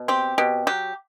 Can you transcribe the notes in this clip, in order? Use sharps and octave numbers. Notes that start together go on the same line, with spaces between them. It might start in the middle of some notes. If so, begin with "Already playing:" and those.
Already playing: B2
C4 G4
B2 G4
F#3 G4